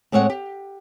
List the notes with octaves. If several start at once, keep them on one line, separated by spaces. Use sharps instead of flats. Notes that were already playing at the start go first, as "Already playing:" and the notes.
A2 G#3 C4 C#5 F#5
G4